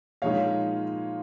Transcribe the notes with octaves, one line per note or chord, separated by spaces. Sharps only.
A#2 F3 G#3 D#4 C#5 F5